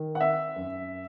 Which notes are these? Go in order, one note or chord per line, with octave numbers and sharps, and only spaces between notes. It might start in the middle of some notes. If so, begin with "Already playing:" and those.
Already playing: D#3
F#5
C4 E5
F#2